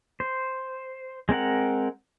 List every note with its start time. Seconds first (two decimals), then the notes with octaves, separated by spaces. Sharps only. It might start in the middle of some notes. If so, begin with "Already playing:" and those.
0.20 C5
1.29 G#3 C4 A#4 F#5